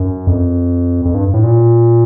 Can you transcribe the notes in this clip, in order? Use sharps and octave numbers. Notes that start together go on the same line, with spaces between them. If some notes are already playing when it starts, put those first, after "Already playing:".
Already playing: F#2
F2
F2
G2
A2
A#2